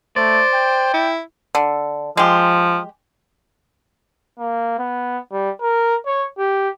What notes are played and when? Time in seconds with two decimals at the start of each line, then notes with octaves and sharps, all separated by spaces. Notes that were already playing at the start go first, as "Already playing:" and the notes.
0.16 A3 C5 D5
0.54 G5
0.94 E4
1.55 D3
2.17 F3 G#3 G4
4.39 A#3
4.79 B3
5.32 G3
5.61 A#4
6.06 C#5
6.38 G4